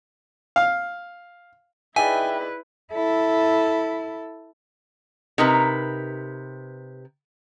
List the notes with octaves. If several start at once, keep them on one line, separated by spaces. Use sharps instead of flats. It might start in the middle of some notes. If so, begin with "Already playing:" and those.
F5
D#4 E4 G#4 B4 D5 E5 G5 G#5
E4 A4
C3 D#4 A#4 B4